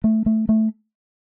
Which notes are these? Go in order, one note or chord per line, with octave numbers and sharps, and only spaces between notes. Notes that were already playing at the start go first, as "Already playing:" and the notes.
A3
A3
A3